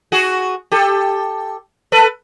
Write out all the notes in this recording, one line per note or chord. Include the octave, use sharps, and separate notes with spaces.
F#4 G#4
G4 A4
A4 B4